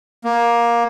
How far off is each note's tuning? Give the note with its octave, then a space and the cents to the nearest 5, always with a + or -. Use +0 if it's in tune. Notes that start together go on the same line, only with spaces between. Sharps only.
A#3 +15